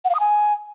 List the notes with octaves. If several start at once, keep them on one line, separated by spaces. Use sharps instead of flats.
F#5
F5
D#6
G#5